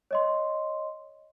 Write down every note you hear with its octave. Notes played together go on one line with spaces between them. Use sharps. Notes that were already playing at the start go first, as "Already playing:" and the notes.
C#5 D#5 C6